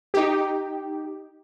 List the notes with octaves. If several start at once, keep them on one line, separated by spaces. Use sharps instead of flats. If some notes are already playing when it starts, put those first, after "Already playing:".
D#4 G4